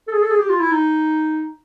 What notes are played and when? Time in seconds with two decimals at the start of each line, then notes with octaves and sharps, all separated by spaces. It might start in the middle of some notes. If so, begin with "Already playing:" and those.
0.08 A4
0.13 G#4
0.22 A4
0.31 G#4
0.40 G4
0.49 F4
0.60 E4
0.72 D#4